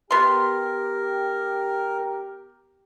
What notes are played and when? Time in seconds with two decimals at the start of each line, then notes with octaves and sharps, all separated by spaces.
0.11 B3 G4 A#4 C6